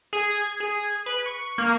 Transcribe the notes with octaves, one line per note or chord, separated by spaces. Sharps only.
G#4
G#6
G#4
B4
C#6
A#3